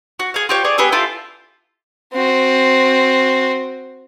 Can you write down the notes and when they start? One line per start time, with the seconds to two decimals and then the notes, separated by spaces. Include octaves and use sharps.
0.19 F#4
0.34 G#4 F5
0.49 F4 G4 C#5
0.64 G#4 C#5 D5
0.78 B3 G4 G#4 E5
0.92 E4 F4 G4 A4
2.13 C4 F#4